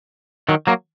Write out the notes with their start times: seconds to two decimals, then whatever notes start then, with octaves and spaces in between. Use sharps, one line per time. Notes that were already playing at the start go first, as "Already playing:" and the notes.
0.49 D#3 F#3
0.67 F#3 A#3